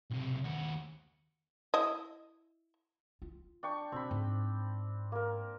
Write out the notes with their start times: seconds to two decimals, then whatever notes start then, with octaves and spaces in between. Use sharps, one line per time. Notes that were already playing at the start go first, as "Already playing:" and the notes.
0.10 B1 C3
0.44 D#2 F#4
1.74 E4 D#5
3.22 F4
3.63 D4 G5 C#6
3.92 B2 C4 B5
4.11 G#2
5.12 A#3 A#4